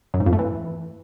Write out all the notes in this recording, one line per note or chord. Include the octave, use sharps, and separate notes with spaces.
F#2
G#2
F2
A3
E3